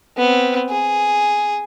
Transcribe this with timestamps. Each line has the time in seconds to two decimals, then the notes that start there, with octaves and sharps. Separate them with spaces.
0.17 B3 C4
0.70 G#4